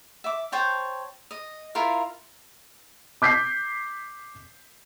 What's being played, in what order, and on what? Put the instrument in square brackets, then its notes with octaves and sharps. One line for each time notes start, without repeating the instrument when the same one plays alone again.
[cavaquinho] E5 D6
C5 C#5 G5 A5
D#5
E4 F4 A#4 F5
[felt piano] D6 G6 B6 C7